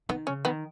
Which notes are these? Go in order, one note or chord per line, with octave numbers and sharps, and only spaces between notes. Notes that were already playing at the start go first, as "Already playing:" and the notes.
D#3 B3
C#3 C#4
D#3 B3